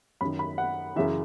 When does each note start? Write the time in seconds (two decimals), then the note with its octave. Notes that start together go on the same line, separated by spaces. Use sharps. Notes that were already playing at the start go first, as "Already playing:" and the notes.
0.21 F#2 D#3 B5
0.39 B5
0.58 F#5
0.96 F#2 C#3 E3 E5